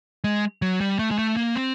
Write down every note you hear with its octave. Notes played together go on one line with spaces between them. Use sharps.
G#3
F#3
G3
A3
G#3
A3
A#3
C4